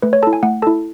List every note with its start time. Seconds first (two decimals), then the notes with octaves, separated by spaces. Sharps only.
0.02 A3 B4
0.13 C#5
0.23 E4 A4 A5
0.33 G#5
0.43 A3 F#5
0.62 E4 A4 A5